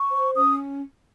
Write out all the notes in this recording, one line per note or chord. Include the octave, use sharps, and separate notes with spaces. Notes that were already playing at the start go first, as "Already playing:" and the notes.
Already playing: C#6
C5
C#4 D#6